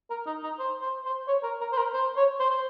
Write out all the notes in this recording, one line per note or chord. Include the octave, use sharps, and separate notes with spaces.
A#4
D#4
D#4
C5
C5
C5
C#5
A#4
A#4
C5
A#4
C5
C#5
C5
C5